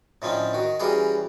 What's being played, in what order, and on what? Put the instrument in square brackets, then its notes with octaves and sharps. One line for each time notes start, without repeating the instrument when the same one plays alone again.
[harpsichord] A2 D3 F3 C4 C#4 D#4
D#3 F#4
E3 G3 C#4 F#4 G#4 A#5